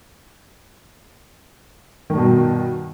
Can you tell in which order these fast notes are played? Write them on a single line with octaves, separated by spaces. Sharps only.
D#3 G2 B2